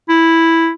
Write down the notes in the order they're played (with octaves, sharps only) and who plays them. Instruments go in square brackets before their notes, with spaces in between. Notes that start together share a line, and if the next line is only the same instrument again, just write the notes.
[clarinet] E4